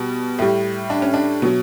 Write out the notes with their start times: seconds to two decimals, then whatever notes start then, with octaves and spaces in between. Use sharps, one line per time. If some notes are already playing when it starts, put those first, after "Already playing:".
Already playing: B2 G3
0.39 A2 G3
0.90 D4
1.02 C#4
1.14 D4
1.42 B2 F#3